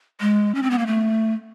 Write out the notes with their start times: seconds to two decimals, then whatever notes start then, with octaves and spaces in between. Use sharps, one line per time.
0.21 G#3
0.55 C#4
0.63 C4
0.70 B3
0.79 A#3
0.87 A3